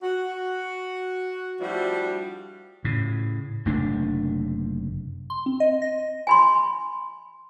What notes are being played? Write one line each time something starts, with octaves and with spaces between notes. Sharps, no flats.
F#4
F3 G3 A3 D4 E4 F#4
A2 C#3
F#1 C3 A3 D4
C6
C4
D#5
A#6
G#5 B5 C6